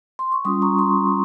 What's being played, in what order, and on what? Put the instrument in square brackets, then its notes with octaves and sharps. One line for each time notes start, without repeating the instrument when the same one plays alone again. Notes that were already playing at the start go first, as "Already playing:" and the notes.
[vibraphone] C6
C#6
G3 C#4 F4 C6 D#6
A#5 C#6
C6